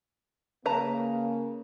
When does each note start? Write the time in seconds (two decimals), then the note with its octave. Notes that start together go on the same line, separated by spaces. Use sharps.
0.66 C#3 A#3 B4 A5 A#5